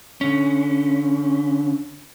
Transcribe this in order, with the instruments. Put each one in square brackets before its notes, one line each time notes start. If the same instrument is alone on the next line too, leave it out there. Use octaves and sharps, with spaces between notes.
[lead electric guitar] D3 C#4